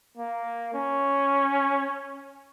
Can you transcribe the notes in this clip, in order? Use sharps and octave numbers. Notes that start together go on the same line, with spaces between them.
A#3
C#4